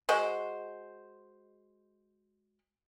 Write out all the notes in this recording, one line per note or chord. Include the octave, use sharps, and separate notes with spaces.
G#3 F#4 C5